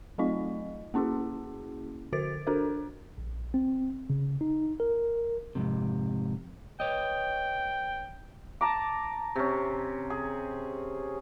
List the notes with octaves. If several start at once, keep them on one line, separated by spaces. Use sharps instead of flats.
F#3 A3 C4 D#4 F4 D#5
A#3 C#4 E4 F#4 G#4
D3 F#4 C5 A6 D7
D4 F#4 A4 A#4 C5
A#1
C4
C#3
D#4
A#4
F2 G#2 C3
B4 C#5 D#5 G5
A5 A#5 D6
C3 C#4
G#4